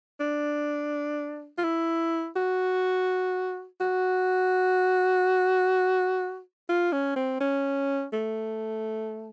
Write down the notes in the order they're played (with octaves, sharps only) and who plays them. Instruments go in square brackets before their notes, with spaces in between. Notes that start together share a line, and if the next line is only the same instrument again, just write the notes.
[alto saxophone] D4
F4
E4
F#4
F#4
F4
C#4
C4
C#4
A3